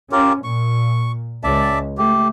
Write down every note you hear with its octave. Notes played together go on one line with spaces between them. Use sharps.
C#4 F4 G4 A#4
A#2 C#6
C#2 D5 E5 A5
A3 G4